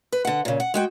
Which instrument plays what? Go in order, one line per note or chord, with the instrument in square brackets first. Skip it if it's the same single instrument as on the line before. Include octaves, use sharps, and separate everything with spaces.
[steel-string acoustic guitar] B4
D3 F#5
A#2 C#3
F#5
G#3 F#4 G5